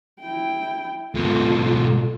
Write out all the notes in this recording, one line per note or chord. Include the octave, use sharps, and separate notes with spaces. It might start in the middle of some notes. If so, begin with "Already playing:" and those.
E4 G5
G#2 B2 F4 A4